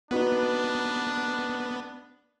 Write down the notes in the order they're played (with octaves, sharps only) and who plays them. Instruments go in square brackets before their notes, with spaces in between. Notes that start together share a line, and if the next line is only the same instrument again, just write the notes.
[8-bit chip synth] B3 [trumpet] D4 [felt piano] D#4 F#4 B4